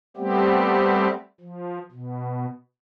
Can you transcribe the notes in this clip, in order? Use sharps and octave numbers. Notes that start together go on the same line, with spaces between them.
G3 A3 B3 C4 G4
F3
B2